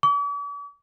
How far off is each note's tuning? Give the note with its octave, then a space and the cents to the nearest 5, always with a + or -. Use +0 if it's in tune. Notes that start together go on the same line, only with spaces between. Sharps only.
D6 -45